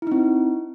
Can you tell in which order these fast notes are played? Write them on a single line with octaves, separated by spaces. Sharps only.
E4 D#4 C4